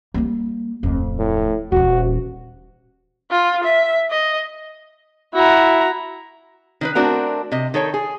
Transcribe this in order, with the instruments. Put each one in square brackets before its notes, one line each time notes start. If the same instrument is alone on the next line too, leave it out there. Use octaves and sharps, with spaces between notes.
[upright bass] G3 A#3
D1 F2
[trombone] A2
[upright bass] D#1 E3 [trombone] F#4
[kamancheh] F4
E5
D#5
[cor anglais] E4 [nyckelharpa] F#4 A#5
[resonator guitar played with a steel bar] D#3 D#4 B4
A3 C4 D4 F#4 A#4 G5
C3 D#5
D#3 A4 C#5 G5
G#4